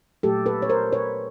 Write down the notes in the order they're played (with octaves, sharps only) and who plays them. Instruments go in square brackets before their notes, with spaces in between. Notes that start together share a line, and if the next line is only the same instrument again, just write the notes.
[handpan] A#2 F#3 A3 G4 A4
A4 B4
C#5
A#4 C5
B4 C#5